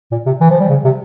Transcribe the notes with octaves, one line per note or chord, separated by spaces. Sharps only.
A#2
C3
E3
F3
G3
C#3
C3